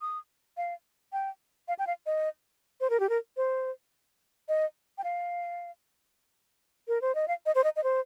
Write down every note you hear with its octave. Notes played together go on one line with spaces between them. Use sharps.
D#6
F5
G5
F5
G5
F5
D#5
C5
A#4
G4
A#4
C5
D#5
G5
F5
A#4
C5
D#5
F5
D#5
C5
D#5
D#5
C5